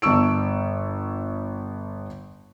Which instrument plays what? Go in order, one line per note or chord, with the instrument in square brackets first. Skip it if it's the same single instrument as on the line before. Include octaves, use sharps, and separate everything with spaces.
[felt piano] G1 A5 C#6 E6 D7